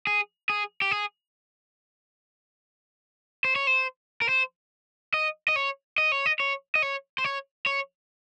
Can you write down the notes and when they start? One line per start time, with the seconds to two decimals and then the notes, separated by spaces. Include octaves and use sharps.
0.07 G#4
0.50 G#4
0.82 G4
0.91 G#4
3.44 C5
3.56 C#5
3.67 C5
4.22 A#4
4.29 C5
5.14 D#5
5.48 D#5
5.56 C#5
5.98 D#5
6.12 C#5
6.26 D#5
6.40 C#5
6.75 D#5
6.82 C#5
7.18 C5
7.24 C#5
7.66 C#5